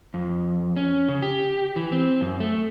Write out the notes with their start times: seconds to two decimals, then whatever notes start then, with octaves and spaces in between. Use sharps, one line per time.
0.14 F2
0.76 C#4
1.08 C#3
1.22 G4
1.76 E3
1.92 C4
2.21 F#2
2.40 A3